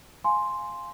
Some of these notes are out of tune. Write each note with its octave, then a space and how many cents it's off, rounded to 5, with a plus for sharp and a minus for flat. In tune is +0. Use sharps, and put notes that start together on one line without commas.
F5 +0 G#5 +10 C6 +0